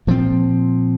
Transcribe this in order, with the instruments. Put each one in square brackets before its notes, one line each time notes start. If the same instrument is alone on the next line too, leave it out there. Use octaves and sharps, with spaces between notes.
[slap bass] A#2 F3 C4